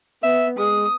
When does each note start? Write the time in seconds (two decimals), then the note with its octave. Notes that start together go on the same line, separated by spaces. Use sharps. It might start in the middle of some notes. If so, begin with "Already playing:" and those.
0.23 B3 E5
0.58 G#3 D#6